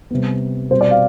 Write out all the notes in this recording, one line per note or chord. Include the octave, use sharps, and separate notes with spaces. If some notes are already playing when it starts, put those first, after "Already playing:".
C3 G3 B3
B2 G3 C4 C5
D5
F5